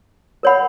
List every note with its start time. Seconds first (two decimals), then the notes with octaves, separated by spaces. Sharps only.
0.43 A#4 C#5 F#5 B5